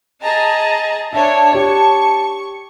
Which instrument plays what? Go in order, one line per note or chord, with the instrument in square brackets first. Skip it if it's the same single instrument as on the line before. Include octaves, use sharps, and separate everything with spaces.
[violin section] G#4 A5 A#5 [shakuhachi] D#5
[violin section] D4 C#5 [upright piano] E5 [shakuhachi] A5
[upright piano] G4 C#5 [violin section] C#6